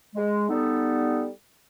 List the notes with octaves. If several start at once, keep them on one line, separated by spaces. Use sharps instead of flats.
G#3
G3 B3 D#4 A4